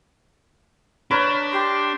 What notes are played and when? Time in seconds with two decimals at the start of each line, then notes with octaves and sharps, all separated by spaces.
1.11 D4 A#4 B4 C#5
1.52 G4 C6